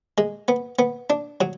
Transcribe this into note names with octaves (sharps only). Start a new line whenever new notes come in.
G#3
B3
B3
D4
F#3